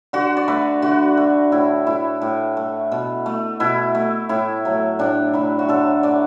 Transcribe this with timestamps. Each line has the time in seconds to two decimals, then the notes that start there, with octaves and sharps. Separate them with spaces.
0.13 D3 F#4
0.37 D5
0.48 A3 B4
0.82 D3 F#4
1.17 A3
1.52 A2 E4
1.87 A3 E4
2.21 A2
2.57 A3
2.92 B2
3.26 A3
3.60 B2 E4
3.95 A3
4.29 A2 E4
4.65 F#3 A3
4.99 A2 D4
5.33 F#3 A3 E4
5.59 F#4
5.69 D3 A4
6.03 A3 D5